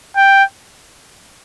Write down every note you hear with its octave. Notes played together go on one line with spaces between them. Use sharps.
G5